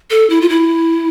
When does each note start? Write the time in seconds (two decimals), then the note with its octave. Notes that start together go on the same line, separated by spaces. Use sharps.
0.10 A4
0.30 E4
0.41 F4
0.49 E4